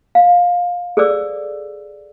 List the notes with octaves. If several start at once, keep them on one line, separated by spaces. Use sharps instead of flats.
F5
G#4 A4 C5 D5 D6 E6